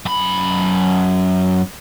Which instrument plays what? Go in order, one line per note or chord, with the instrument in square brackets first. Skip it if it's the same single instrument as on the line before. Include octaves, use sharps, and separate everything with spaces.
[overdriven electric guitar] F#2 B5